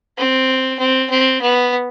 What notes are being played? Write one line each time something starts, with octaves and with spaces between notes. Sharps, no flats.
C4
C4
C4
B3